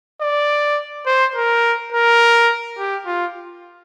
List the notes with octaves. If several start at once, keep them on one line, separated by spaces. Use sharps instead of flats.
D5
C5
A#4
A#4
G4
F4